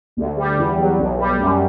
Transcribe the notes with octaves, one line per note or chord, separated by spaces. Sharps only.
D2
G3
E2
F#3
B1
G3
F#2